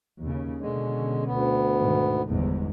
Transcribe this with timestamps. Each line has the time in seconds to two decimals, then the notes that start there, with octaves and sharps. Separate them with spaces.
0.21 D#2 C#3
0.61 B2 D3 G#3 C#4
1.26 D2 B3
1.79 G#2 B2 D#3
2.28 G1 E2 G#2